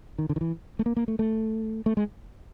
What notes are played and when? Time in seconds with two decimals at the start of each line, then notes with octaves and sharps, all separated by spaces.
0.18 D#3
0.29 D3
0.36 D#3
0.41 E3
0.79 A3
0.86 A#3
0.97 A#3
1.08 A3
1.19 A3
1.86 A3
1.97 G#3